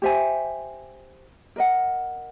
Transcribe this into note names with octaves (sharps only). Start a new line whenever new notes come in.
G4 C5 E5 G#5
A#4 D#5 F#5